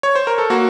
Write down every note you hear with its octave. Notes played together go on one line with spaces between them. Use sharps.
C#5
C5
A#4
A4
A#3 F#4